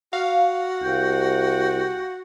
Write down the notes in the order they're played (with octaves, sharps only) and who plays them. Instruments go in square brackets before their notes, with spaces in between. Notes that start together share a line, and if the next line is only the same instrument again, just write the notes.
[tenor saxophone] F#4 [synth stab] F5
[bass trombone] C2 [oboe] G5